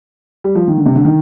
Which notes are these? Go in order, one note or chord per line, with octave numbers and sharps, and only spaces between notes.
G3
F3
D#3
D3
C3
D3
D#3